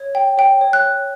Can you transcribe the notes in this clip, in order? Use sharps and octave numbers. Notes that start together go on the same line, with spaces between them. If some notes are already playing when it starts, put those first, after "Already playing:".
Already playing: C#5
G5
C#5 G5
C#5
F#6
C#5